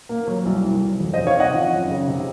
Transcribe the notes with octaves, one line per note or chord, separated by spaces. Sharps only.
A#3
F#3
C2
C2
F#3
F2
C5 D#5
C3
C#5 F5
C4 D#5 F#5
F3
F#2
C#3
C3